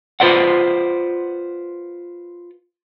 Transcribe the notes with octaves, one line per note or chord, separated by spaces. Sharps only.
F4 B4 C5 D5 F#5